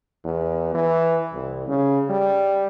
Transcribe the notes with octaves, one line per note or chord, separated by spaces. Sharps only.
E2
E3
C2
C#3
G3